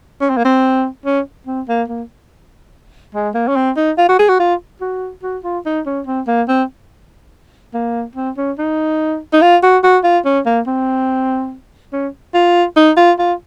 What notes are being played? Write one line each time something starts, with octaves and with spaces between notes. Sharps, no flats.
C#4
C4
A#3
C4
C#4
C4
A#3
A#3
G#3
A#3
C#4
C4
D#4
F4
F#4
G#4
F#4
F4
F#4
F#4
F4
D#4
C#4
C4
A#3
C4
A#3
C4
C#4
D#4
D#4
F4
F#4
F#4
F4
C#4
A#3
C4
C#4
F4
D#4
F4
F4